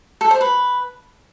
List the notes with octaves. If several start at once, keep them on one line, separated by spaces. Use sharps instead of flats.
A4
C5
B4